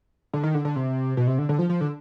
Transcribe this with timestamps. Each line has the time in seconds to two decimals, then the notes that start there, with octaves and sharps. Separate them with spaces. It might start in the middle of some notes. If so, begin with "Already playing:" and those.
0.33 D3
0.44 D#3
0.55 D3
0.65 D3
0.76 C3
1.17 B2
1.27 C3
1.38 D3
1.49 D3
1.59 F3
1.70 F3
1.81 D3